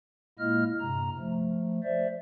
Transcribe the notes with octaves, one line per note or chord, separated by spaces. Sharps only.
A#2 G#3 A#3 E4 D#5 F6
G2 C3 A#5
F3 A3
C5 D5 E5